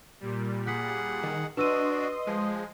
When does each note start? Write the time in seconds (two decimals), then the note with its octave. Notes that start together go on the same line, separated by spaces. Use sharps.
0.20 A#2 G3
0.67 G#4 F#5 F#6 B6
1.23 D#3
1.57 D4 F#4 B4 D#5 C6 D#6 E6 D#7
2.27 F3 G#3